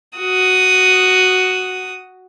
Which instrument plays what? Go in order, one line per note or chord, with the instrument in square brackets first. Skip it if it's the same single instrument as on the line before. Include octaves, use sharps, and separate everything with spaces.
[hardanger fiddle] F#4 D#6